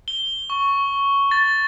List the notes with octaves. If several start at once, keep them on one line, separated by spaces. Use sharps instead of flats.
G7
C#6
A6